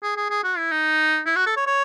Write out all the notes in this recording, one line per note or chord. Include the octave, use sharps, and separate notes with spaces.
G#4
G#4
G#4
F#4
E4
D#4
E4
F#4
A4
C#5
C#5